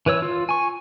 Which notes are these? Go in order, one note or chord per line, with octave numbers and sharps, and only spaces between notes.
E3 B4 C#5 E6
F4
G#5 C#6